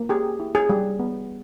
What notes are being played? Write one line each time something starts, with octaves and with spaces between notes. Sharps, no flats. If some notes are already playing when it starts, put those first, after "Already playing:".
Already playing: A#3
G4 G#4
E4
G#4
G3
B3